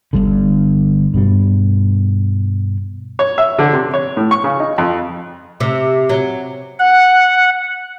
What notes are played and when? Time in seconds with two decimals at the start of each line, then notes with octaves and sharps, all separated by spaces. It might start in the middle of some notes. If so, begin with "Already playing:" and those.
0.13 G1 G2 D3
1.14 G2 B2 G3
3.19 C#5
3.38 E5
3.59 D3
3.73 C3
3.94 C#5
4.17 A2
4.31 C#6
4.44 C#3
4.60 D#4
4.78 F2
5.60 C3
6.09 F#3
6.79 F#5